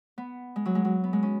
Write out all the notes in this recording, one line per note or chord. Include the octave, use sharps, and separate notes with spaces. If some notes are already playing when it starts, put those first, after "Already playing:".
B3
G#3
F#3
G#3
F#3
B3
G#3
C#4